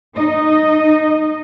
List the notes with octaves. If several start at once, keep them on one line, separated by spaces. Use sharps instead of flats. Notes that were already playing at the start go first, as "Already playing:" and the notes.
D#4 D#5